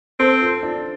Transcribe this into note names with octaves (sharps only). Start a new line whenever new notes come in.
C4 A4 C5
F4 A4
D4 F4